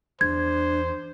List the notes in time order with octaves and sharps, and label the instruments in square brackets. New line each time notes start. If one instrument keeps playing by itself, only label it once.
[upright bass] E2 [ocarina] D4 [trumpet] C5 [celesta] G#6